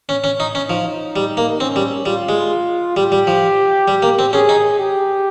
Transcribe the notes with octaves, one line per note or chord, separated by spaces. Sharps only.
C#4
C#4
D#4
C#4
F3 D#4
G3
A#3
C4 C#4
G3
G3 F4
G#3
G3 G4
G3
F3
G3
A#3
C4
C#4 G#4
D#4
G4